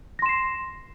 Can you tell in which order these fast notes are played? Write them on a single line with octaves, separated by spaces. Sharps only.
A#6 C6 E7 C7